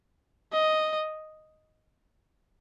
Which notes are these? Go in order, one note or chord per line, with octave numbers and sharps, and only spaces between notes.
D#5